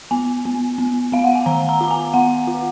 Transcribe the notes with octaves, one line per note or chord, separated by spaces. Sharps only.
B3 G#5
B3
B3
B3 F5
F#5
G#5
D#3 A#5
A#5
F4 A#5
G#5
B3 F#5
F4